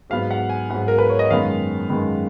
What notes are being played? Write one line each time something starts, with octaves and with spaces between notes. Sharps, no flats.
G#2 F#3 B3 F5
F#5
G#5
G#2 F#3 B3 F#5
A#4
B4
C#5
D#5
F#2 D#3 G#3 B3 F5
F#2 D#3 G#3 B3